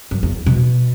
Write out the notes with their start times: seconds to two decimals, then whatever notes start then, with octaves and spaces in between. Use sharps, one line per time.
0.11 F#2
0.23 E2
0.47 B2